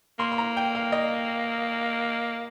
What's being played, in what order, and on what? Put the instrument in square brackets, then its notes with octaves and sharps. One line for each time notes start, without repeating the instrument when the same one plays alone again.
[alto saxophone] A#3 [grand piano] C6
[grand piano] C6
A#5
G5
F5
D#5